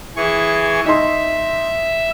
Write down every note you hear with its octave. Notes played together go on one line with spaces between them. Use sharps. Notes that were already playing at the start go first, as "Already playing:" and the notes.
E3 G#4 C#6
D#4 E5 C6